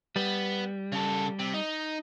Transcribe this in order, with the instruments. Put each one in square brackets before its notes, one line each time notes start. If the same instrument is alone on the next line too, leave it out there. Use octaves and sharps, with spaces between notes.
[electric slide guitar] G3 [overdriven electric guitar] B3
[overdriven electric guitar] C#3 A4
C3
D#4